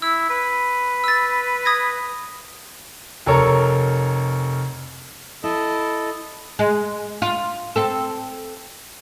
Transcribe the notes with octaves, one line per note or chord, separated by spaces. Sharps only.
E4 E6
B4
E6 A6
D#6 G#6 A#6
F1 A4 A#4 C#5 A#5
E4 A4 D#5
G#3
F4
C4 A4